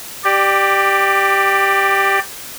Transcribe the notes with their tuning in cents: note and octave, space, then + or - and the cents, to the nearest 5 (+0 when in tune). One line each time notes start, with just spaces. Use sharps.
G4 +0 D5 +20